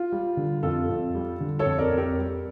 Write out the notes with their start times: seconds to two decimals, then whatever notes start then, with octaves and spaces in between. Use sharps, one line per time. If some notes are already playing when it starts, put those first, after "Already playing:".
Already playing: F4
0.12 G3
0.37 D3
0.63 F2 F4 A4
0.89 F2
1.15 G3
1.40 D3
1.59 A4 C#5
1.66 F2
1.78 A#4 D5
1.92 F2
1.98 G4 A#4
2.18 G3